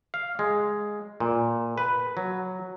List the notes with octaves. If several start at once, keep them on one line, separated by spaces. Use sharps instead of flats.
F5
G#3
A#2
B4
F#3